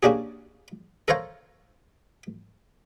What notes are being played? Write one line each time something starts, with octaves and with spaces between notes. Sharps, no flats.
A#3 C#4 D4 G4 G#4
A4 A#4 C5 C#5 F5